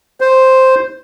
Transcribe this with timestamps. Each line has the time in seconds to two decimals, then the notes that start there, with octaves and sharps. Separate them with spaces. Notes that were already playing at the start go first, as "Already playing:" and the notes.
0.21 C5